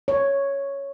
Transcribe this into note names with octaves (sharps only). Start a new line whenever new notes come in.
C#5